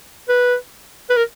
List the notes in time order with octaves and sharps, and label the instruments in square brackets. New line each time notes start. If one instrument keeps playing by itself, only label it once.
[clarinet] B4
B4
A#4